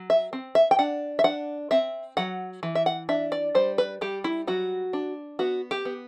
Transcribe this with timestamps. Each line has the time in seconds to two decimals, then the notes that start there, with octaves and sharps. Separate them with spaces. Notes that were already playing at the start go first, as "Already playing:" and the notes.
Already playing: F#3
0.10 E5
0.33 C4
0.55 E5
0.71 G5
0.79 D4 F#5
1.19 E5
1.24 D4 F#5
1.71 C4 E5
2.17 F#3 F#5
2.63 E3
2.75 E5
2.86 F#5
3.09 D4 E5
3.32 D5
3.55 G3 C5
3.78 B4
4.01 G3 G4
4.24 E4
4.47 F#3 F#4
4.93 D4
5.39 B3 F#4
5.71 G4
5.85 B3